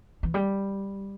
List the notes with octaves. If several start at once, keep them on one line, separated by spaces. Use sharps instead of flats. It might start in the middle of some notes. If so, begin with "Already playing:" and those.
E3
G3